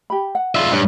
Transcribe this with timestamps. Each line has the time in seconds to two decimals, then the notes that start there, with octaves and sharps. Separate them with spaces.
0.10 G4 B5
0.35 F#5
0.55 F4 G#4 C#5 D5 E5
0.71 G2 D4 C#5 D5